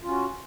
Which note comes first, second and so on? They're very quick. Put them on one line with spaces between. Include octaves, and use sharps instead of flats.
F4 C#4 F#4